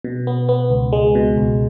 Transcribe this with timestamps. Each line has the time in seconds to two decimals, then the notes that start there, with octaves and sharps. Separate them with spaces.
0.04 B2
0.27 B3
0.49 B3
0.70 C#2
0.93 G#3
1.15 B2
1.37 C#2